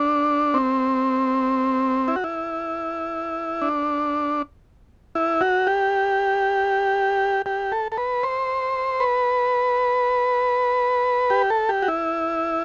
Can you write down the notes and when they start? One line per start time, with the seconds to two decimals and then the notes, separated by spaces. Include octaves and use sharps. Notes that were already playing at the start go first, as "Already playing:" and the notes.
Already playing: D4
0.54 C4
2.08 E4
2.16 F#4
2.24 E4
3.62 D4
5.15 E4
5.41 F#4
5.67 G4
7.46 G4
7.72 A4
7.92 A4
7.98 B4
8.23 C5
9.00 B4
11.30 G4
11.50 A4
11.69 G4
11.82 F#4
11.88 E4